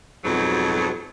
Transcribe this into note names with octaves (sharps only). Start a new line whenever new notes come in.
F2 G#2 B2 F#3